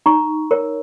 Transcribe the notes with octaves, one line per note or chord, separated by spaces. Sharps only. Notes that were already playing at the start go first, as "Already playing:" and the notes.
D#4 A#5 C#6
A#4 C#5